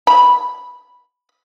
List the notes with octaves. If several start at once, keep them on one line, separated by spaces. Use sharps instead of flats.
B5